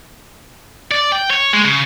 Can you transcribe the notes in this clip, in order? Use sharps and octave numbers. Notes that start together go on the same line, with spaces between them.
D5
G5
C#5
G#3
C#3